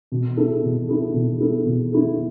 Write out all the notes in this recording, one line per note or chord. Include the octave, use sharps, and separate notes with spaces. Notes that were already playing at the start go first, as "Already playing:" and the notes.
B2
B3 E4 A4
B2
B3 E4 A4
B2
B3 E4 A4
B2
B3 E4 A4